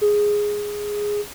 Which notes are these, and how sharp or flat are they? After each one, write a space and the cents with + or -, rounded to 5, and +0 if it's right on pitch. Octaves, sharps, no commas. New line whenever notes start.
G#4 -5